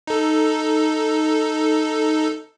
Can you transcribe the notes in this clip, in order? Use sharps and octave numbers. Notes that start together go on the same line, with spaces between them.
D#4 A4